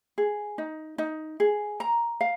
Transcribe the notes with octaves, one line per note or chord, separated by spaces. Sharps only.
G#4
D#4
D#4
G#4
A#5
F5